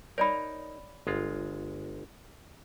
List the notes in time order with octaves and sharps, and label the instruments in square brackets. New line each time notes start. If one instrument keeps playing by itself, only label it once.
[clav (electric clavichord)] D#4 A#4 [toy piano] C#5 D5 B5
[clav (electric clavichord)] G1 G#3 F4